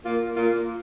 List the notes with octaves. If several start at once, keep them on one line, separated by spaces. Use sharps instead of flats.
A#2 A#3 F4
A#2 A#3 F4